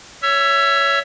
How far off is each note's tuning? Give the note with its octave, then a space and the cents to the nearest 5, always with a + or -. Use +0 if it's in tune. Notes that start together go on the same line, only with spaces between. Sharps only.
C#5 +10 E5 +0 E6 +30